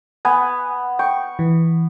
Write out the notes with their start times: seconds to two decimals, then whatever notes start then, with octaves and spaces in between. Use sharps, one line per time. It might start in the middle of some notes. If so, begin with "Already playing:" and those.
0.25 B3 F#5 G#5
0.99 G5 C#6
1.39 E3